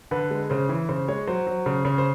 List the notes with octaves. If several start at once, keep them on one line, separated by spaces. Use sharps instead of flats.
D3 B4
G#3
C#3 C5
E3
C#3 C5
G#3 C#5
F#3 C5
F#3
C#3
C#3
C5